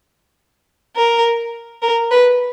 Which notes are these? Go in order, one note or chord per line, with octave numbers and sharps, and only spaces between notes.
A#4
A#4
B4